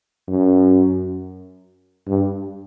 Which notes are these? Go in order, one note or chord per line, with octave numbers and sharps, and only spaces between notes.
F#2
G2